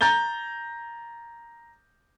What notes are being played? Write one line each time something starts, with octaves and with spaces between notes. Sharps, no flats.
A#5 G6 A6 G7